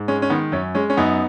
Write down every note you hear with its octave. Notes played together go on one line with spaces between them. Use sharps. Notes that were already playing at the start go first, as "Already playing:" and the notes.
Already playing: G#2
G#3 C#4
C#4
D#3 B3
F#2 C#4
G#3 C#4
C#4
F#2 B3 D#4